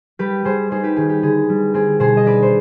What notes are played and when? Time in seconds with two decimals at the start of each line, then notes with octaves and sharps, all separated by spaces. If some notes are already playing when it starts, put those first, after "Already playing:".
0.19 G3 G4 B4
0.45 G3 G#4 C5
0.71 D#4 G#4 C5
0.83 G4 B4
0.96 D#3 G#4
1.09 G4
1.22 D3 G#4
1.49 G3
1.74 C4 G#4
2.00 B2 G#4 C5
2.17 D#5
2.26 D4 B4 D5
2.42 C5